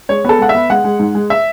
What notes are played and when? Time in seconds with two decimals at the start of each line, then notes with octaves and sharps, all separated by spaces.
0.09 G#3 C#5
0.25 B3 A4
0.39 G#3 F#5
0.49 E5
0.55 B3
0.70 G#3 F#5
0.84 G#3
1.00 G#2
1.15 G#3
1.30 E5